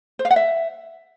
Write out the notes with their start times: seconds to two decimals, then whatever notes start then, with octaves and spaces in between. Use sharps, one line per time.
0.19 C5
0.25 F5
0.31 F#5
0.36 E5